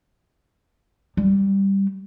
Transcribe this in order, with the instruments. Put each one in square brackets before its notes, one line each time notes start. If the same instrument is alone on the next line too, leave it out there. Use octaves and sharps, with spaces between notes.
[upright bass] G3